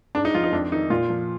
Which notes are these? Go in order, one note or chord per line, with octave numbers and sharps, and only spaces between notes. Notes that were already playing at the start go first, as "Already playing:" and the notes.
G#2 D4
D#4
F3 F4
D#4
F2 D4
D#3 D#4
A#2 F4
F3